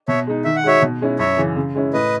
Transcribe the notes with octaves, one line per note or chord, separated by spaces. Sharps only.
B2 C#5 E5
G#3 D#4
D#3 E5
F#5
G#3 D#4 F#4 C#5 E5
B2
G#3 C#4 E4
F#2 C#5 E5
C#3 E3
C#3
G#3 C#4 E4
A2 B4 D#5